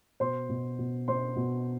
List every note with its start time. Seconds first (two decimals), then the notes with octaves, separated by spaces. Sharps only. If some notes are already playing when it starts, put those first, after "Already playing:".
0.20 B2 C5 C6
0.49 B2
0.79 B2
1.08 B2 C5 C6
1.36 B2